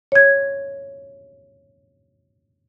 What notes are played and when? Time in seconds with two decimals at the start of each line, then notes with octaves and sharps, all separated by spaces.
0.12 C#5 G#6